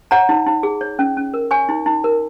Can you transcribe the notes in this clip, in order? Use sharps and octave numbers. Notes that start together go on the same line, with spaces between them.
C#5 F#5 A#5
D#4
D#4
G#4
C#5
C#4
C#4
A#4
C#5 G#5 C#6
D#4
D#4
A#4